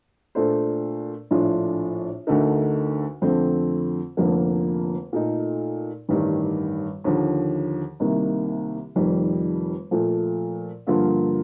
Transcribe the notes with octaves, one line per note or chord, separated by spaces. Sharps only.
A#2 A3 D4 A4 C5
A#1 A2 A3 D4 F4
D2 D3 A3 D#4 A#4
F2 D3 A3 C4
F1 F2 D3 F3 A#3
A#2 A3 D#4 A4
A1 G2 D#3 G3
D#2 D3 F3
C2 C3 D#3 A#3
F1 F2 D#3 G3
A#2 F3 A3
G2 D3 F3 A#3 F4